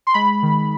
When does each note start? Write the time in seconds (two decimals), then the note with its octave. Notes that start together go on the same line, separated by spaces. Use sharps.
0.07 C6
0.14 G#3 B5
0.43 D#3